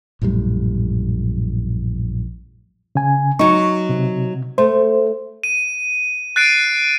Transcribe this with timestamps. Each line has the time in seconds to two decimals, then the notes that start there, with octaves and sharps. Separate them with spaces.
0.22 A#1 F#2 A2 G3
2.95 C#3 G#5
3.39 F#3 D#4 C#6
3.89 C3
4.58 A3 C5
5.44 D#7
6.36 F#6 A6 C7 D7 D#7